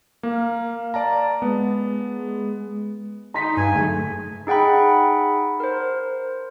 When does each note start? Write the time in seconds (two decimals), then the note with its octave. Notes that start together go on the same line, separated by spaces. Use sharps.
0.23 A#3 F5
0.94 D5 A5 A#5
1.42 G#3 B3
3.34 D#4 A#5 C6 B6
3.57 G2 G#5
3.75 F#1 A3
4.47 D#4 G#4 F#5 G5 B5
5.60 A#4 C5